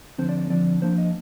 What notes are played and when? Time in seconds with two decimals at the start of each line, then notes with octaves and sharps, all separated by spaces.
0.18 D3 F3 C4 C5
0.29 D5
0.39 D5
0.50 D3 F3 C4 D5
0.82 F3 A#3 D4 C5
0.98 D#5